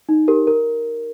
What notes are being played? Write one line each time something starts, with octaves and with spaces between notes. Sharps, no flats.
D#4
G4 A#4
A#4